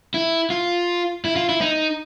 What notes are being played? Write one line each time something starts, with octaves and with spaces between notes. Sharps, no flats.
E4
F4
E4
F4
E4
D#4